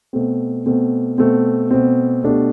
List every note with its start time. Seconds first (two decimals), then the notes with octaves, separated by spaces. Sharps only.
0.13 B2 A3 C4
0.66 B2 A3 C4
1.18 B2 A3 C4
1.71 B2 A3 C4
2.24 B2 A3 D4 G4